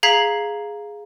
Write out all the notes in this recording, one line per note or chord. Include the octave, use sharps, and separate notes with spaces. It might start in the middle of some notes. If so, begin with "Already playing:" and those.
G#4 F5 A#5 G#6 B6 C7